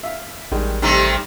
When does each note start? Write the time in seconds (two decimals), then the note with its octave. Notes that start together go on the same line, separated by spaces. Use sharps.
0.03 E5 F5
0.52 A1 D#3 G3 G#3
0.82 C3 D#3 G3 A3 A#5 E6